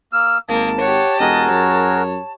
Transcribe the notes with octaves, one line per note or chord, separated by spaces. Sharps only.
A#3 E6 F6
G#1 A#3 A5 D#6
G4 C#5 F#5
E1 F#4 G#4 A#4 D#5
F#2 C#5